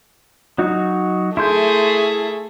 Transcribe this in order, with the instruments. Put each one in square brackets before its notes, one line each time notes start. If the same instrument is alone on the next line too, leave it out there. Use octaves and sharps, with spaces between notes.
[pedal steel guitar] F#3 D#4 F#4
[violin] A3 G#4 [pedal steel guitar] E4 C6 G6